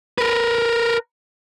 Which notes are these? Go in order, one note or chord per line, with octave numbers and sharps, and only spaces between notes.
A#4 B4